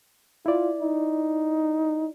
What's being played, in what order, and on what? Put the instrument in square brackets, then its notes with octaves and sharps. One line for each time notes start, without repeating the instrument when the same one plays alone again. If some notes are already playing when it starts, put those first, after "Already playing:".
[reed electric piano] E4 D5 [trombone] F4
[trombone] D#4